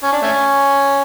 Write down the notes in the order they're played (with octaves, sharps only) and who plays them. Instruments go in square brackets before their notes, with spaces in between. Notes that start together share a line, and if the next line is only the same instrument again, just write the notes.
[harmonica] C#4
D4
A3 C#4